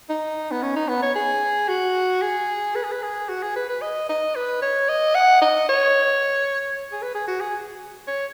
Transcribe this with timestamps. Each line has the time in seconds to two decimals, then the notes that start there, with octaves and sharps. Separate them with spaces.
0.10 D#4
0.51 B3
0.63 C#4
0.76 D#4
0.89 B3
1.03 C#5
1.16 G#4
1.68 F#4
2.22 G#4
2.75 B4
2.84 G#4
2.92 B4
3.03 G#4
3.29 F#4
3.43 G#4
3.56 B4
3.69 B4
3.82 D#5
4.09 D#5
4.36 B4
4.62 C#5
4.89 D#5
5.15 F#5
5.41 D#5
5.69 C#5
6.92 G#4
7.02 B4
7.15 G#4
7.28 F#4
7.41 G#4
8.08 C#5